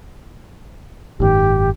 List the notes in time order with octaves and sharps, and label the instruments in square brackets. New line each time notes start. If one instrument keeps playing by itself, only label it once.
[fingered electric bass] F#1 G#2 D#3 [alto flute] G4